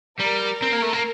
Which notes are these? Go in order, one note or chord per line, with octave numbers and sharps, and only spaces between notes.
G3 A#4
C4
A#3
A3
A#3